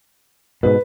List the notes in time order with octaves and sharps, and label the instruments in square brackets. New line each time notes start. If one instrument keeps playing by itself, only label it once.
[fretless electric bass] G#2 B2 [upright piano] B4